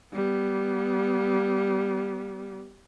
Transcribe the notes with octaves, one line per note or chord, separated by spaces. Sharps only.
G3 B3